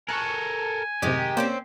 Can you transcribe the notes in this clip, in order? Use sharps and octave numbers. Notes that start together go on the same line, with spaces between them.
A4 A#4 G#5 C#6 F#6
F#2 A2 C3 D#3 G#3 D#4 G4
A#3 C4 C#4 C5 D5 G5